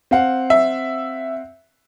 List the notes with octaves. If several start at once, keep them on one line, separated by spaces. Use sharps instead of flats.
C4 F5 F#5
E5